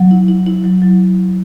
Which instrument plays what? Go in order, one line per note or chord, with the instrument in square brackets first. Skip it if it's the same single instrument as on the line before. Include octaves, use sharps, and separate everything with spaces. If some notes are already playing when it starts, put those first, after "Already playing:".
Already playing: [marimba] F#3
E4
E4
E4
F#3
F#3